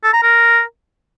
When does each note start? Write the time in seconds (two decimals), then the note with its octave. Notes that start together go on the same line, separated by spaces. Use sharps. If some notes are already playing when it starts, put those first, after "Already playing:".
0.04 A4
0.13 A#5
0.23 A#4